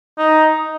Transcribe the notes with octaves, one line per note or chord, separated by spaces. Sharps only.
D#4